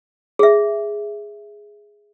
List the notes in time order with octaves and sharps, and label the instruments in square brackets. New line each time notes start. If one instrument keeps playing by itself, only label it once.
[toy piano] G#4 E5